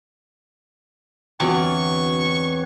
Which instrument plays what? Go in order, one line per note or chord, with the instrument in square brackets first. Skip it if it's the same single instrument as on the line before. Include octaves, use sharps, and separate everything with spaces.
[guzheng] E2 [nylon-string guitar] D3 F#4 G5 [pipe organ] C4 B4 C#5 [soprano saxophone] C#6